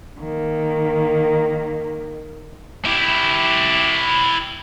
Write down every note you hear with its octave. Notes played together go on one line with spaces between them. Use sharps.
D#3 A#3
E4 G4